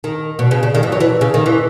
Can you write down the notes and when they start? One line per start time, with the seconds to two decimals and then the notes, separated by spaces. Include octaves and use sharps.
0.04 D#3
0.39 B2
0.51 C#3
0.63 C#3
0.75 D#3
0.83 E3
0.92 F#3
1.00 E3
1.21 C#3
1.34 D#3
1.46 E3